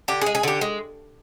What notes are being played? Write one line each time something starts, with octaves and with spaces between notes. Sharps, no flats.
D3 G4
G#4
G#3
G#4
D3 G4
G#3